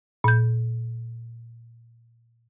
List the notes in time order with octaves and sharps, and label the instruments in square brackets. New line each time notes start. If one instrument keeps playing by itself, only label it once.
[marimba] A#2 G6